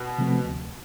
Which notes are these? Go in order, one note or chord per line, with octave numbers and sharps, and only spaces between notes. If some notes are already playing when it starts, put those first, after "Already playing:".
Already playing: B2
C3 F3 A3 C4
D2